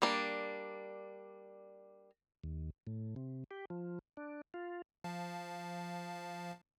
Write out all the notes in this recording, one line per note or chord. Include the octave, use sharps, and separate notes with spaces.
G3 A#3 D4
D#2
A2
C3
G4
F3
D4
F4
F3 F5 A5